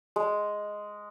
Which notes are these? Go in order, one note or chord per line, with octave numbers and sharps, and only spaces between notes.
G#3